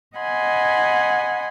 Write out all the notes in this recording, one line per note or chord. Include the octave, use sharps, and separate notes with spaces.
D#5 F#5 G#5 B5 C6